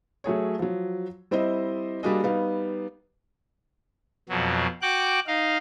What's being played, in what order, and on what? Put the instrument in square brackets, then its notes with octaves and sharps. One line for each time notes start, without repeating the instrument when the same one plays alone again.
[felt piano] F#3 A3 G#4 C#5
F3 F#3
G3 C4 E4 C5 D#5
G3 A#3 D4 F#4 G#4 D#5
G3 B3 D#4 F5
[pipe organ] F2 B2 F#3
F#4 G5 D6 F#6
D#4 F5